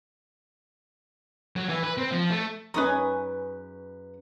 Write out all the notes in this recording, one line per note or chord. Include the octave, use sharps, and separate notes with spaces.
F#3
E3
B4
C4
F3
A3
F#2 C#4 D#4 G#4 B4 A#5 C#6 D#6